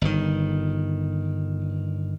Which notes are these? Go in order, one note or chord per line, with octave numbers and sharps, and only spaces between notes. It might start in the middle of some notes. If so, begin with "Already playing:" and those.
G1 D#3